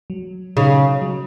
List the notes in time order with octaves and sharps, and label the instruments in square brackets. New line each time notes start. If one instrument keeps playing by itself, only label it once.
[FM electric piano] F#3
[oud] C#3 [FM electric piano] D#4
[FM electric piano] F#3